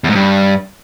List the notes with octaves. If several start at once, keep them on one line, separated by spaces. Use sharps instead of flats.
E2
G#2
G2